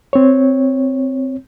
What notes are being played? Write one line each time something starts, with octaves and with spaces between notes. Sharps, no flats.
C4 C#5